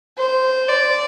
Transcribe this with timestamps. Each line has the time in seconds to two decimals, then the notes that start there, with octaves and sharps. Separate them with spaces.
0.18 C5
0.69 D5